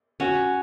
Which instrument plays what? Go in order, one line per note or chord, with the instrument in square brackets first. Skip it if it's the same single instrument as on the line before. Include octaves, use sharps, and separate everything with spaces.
[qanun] C#4 [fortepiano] F#4